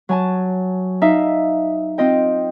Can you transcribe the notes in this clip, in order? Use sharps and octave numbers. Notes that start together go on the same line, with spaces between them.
F#3 G#5 A5
D#4 E5 F5
C4 F4 D#5 G5